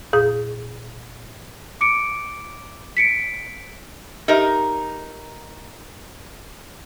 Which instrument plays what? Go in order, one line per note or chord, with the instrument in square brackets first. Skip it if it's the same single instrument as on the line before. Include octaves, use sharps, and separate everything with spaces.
[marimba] F2 A#2 G#4 D#6
[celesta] D6 C#7 D7
B6 C#7 D7
[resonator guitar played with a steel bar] D#4 A#4 [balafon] G4 E5